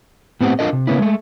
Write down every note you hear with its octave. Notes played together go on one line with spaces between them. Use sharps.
A2 B3 C4 G4 F#5
D4 F4 A4 A#4 D#5
C3
C#3 A#3 B3 C#4 E4
G#3 A3